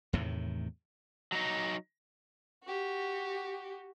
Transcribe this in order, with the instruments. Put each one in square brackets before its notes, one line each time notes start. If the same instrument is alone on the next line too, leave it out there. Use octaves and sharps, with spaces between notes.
[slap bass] E2 A2 C3 D#3
[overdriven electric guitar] F#3 D#4
[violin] F#4 G4